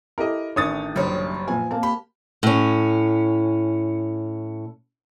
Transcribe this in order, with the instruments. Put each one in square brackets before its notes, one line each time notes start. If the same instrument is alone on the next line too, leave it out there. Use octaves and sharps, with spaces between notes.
[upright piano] E4 G4 A4 [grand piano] A#4 D#5
[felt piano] A1 D#3 D4 [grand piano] C#5 D#6 A6
[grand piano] F#1 [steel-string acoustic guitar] G3 C#5
[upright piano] A#2 F3 B3 [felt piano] G#5
[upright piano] A#3 C4 [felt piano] A5
[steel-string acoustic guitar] G4 [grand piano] B5
[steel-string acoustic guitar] A2 C#4